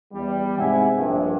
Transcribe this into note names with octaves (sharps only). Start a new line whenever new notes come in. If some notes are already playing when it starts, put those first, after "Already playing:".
E2 G3
G#2 C3 E4 F#5 G#5
A#1 G2